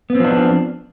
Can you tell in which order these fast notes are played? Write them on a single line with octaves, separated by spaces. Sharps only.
B3 C4 F3 D4